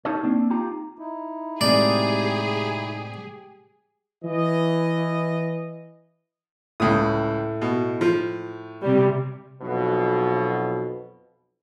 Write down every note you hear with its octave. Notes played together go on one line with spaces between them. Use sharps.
D#4 G4 A4 A#4 C#5
A#3 C4 D4
D#4 F4 G4 A#5
D#4 E4
A2 C3 G#3 G4 G#4 D5
E3 D#5
C#2 A2 D#6
B2
F3
C3 G3
B1 F2 B2